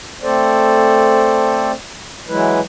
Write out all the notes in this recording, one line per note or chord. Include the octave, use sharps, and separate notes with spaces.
A3 C4 A4 C5 D5
E3 F#3 G#3 E4 B4